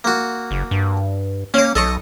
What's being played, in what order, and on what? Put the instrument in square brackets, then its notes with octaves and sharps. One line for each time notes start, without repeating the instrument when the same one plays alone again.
[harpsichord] A#3 F#4
[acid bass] F#1
G2
[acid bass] A#3 [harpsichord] C#4 C#5
[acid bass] B1 [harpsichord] A4 D#5 C#6